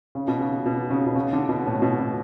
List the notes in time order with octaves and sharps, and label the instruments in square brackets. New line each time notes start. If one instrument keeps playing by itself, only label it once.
[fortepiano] C#3
B2
C#3
B2
C#3
B2
C#3
D3
B2
A2
B2
B2